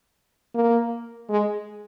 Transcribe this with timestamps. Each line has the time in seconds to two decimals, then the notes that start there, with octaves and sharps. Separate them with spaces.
0.55 A#3
1.29 G#3